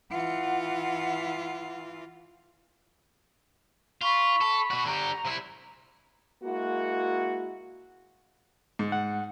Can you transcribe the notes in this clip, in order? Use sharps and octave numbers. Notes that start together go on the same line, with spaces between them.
E3 F4 F#5
F4 B5 C#6
A4
B2 F#4
D3 G4 A#5
C3 E4
G#3 A#3 E4 F#4
G#2
F#5